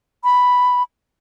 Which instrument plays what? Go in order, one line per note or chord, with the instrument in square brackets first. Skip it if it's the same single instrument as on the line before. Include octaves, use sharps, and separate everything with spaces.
[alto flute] B5